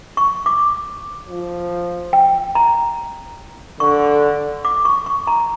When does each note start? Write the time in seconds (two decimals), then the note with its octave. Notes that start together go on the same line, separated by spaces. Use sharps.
0.17 C#6
0.46 D6
1.29 F3
2.13 G5
2.55 A#5
3.80 D3 C#6
4.65 D6
4.85 C#6
5.06 C#6
5.27 A#5